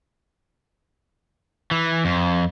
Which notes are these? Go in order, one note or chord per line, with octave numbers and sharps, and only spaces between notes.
E3
F2